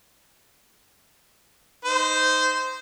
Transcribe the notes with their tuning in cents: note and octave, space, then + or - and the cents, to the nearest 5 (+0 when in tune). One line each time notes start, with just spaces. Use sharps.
D#4 +0 C5 -15